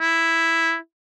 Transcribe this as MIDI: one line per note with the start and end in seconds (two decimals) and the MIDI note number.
0.01 0.76 64